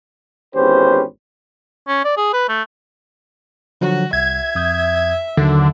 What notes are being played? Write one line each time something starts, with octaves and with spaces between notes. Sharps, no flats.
G#1 E2 C#4 G4 B4 C5
C#4
D5
G#4
B4
A3
D3 F3 F#3 F#4
C2 E5 G#6
F2 D#6 G6
D#2 D3 D#3 F#3